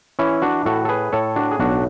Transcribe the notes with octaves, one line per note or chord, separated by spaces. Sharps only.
E3 C#4 E4
D4 F#4
A2 F#4 A4
A4
G#4 B4
A2 A4 C#5
D4 F#4
G#4
B1 D4 F#4